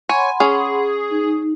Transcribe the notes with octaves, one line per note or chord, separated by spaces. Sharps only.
C#5 F#5 G#5 B5 C6
C#4 G#4
D#4